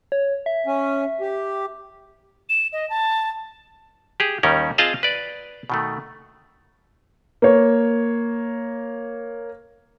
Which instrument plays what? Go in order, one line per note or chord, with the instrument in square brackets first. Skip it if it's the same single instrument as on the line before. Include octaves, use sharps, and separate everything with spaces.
[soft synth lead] C#5
E5
[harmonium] C#4
G4
[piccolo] E7
D#5
A5
[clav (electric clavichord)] G4 G#4
D#2 D#3 G3 C#4 A#4
C4 F4 G#4 D#5 F5 A5
B4 D5
B2 D#3 A3
[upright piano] A#3 C#5